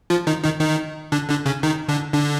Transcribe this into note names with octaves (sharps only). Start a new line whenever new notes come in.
F3 F4
D#3 D#4
D#3 D#4
D#3 D#4
D3 D4
D3 D4
C#3 C#4
D#3 D#4
D3 D4
D3 D4